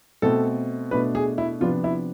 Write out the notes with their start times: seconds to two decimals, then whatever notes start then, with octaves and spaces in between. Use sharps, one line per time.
0.22 B2 A3 C4 A4
0.91 B2 A3 D4 B4
1.15 G#4
1.38 E4
1.60 C3 F3 B3 D4 F4
1.84 E4